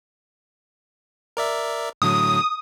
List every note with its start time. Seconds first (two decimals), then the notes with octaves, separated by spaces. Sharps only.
1.37 A#4 D5 E5
2.02 A2 D3 F#3 D#6